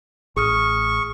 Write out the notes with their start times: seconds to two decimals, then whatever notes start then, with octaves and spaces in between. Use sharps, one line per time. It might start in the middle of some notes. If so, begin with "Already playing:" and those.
0.37 A1 G#4 C#6 D#6 F6